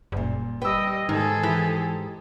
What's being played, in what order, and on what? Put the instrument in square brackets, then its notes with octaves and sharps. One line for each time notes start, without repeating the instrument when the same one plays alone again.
[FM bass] F#1 [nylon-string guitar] A#2 G3
[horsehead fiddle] G3 D#5 [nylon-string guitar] B4 [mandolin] G5 E6
[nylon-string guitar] G#2 [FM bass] D#3 [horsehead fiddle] G#4 A4
[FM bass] E3 [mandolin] G4